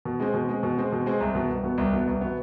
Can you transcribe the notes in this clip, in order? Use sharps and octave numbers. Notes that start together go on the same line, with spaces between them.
B2
G#3 C4
B2
G#3 C4
B2
G#3 C4
B2
G#3 C4
C2
B2
B3
C2
B2 B3
C2
B2 B3
C2
B2 B3